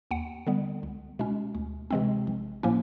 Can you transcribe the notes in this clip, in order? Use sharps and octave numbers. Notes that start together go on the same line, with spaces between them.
D#2 F#5
D3 G3 B3
C#2
B2 G#3 C#4
D2
C3 E3 G#3 C4
A#1
A2 F3 A#3 C#4